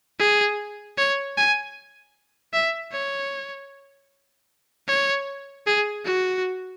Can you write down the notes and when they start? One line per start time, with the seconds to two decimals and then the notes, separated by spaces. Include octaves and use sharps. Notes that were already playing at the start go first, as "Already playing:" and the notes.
0.19 G#4
0.97 C#5
1.37 G#5
2.53 E5
2.92 C#5
4.88 C#5
5.67 G#4
6.05 F#4